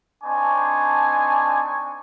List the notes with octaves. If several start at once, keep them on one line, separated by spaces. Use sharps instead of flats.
C4 D4 D#4 G#5 A5 C#6